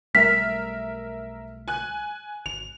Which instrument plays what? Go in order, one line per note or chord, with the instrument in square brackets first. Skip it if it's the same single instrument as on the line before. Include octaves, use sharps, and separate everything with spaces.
[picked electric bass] B1 G3 A3 [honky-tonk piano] A#4 E5 F6 [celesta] B6
[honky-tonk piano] G#5 F#6
[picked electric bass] G#1 [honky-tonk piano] F7